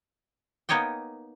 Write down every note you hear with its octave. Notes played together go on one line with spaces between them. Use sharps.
A#3 B3 D#4 C#5 D#5 G5